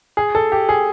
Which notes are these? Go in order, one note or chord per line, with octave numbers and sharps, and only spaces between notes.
G#4
A4
G4
G#4